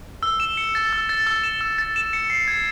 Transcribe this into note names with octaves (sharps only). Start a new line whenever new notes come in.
E6
E7
C#7
A6
E6
A6
E6
E7
E6
A6
E7
C#7
C7
G#6